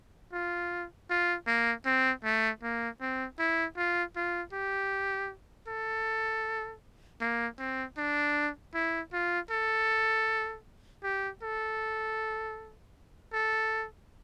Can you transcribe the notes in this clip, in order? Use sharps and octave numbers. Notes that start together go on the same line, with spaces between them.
F4
F4
A#3
C4
A3
A#3
C4
E4
F4
F4
G4
A4
A#3
C4
D4
E4
F4
A4
G4
A4
A4